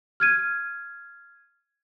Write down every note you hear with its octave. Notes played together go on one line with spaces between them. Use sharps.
F6 G#6 D#7